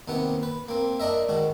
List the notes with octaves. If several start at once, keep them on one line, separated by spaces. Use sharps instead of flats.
D#2 C3 B3 F#5
B4
A#3 C4
D4 A#4 D#5 E5
G#2 D#3 F#4